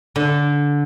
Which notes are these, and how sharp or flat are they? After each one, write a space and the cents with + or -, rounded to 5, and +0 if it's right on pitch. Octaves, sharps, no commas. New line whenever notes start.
D3 -15